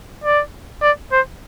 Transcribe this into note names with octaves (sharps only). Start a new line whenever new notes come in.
D5
D5
C5